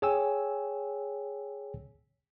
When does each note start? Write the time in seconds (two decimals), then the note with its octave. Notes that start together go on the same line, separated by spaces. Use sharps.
0.02 G#4 C#5 G5 G#5 E6